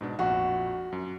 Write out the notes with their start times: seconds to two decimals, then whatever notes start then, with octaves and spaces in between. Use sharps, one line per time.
0.01 G#2 B2 D4
0.19 A#1 F2 F#4
0.92 F#2